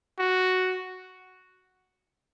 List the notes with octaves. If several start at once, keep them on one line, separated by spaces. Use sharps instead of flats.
F#4